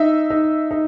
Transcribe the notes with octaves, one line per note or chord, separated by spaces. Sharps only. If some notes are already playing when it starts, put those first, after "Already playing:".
Already playing: D#4 E5
D#4
D#4